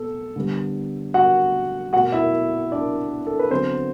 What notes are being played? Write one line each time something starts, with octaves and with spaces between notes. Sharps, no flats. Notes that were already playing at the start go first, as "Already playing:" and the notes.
Already playing: B2 B3 A4
D3 G3 B3
F#4 F#5
B2 A3 F#4 F#5
E4 E5
D4 D5
A4
B4
D3 F#3 B3 C4 C5